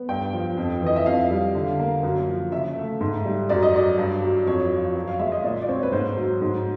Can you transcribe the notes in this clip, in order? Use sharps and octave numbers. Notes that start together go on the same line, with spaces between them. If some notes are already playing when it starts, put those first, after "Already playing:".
Already playing: B3
G2 G5
F3
F2
E3 D#5
E5
F2 F5
G3
D3
A#3
F#2
F3
C#3 E5
A3
G#2
G3
F#2 D5
D#5
F#3 D5
G2
F#3
F2 C#5
F3
F#2
F5
G#3 E5
D#5
A#2 D5
D5
C4 C#5
B4
G#2 C5
F#3
G#2